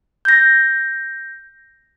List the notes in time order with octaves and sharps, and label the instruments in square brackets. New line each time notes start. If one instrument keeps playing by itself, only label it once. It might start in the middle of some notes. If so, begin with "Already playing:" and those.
[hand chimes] G6 A#6